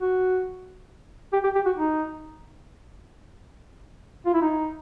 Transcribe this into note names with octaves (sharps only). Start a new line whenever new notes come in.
F#4
G4
G4
G4
F#4
D#4
F4
E4
D#4